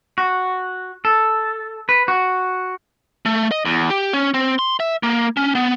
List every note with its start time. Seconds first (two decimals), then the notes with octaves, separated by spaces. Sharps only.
0.18 F#4
1.05 A4
1.89 B4
2.08 F#4
3.26 A3
3.51 D#5
3.65 E2
3.90 G4
4.13 C#4
4.34 C4
4.59 C6
4.80 E5
5.03 A#3
5.37 C#4
5.55 B3